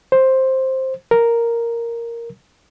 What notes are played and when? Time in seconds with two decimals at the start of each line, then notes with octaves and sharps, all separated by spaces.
0.12 C5
1.11 A#4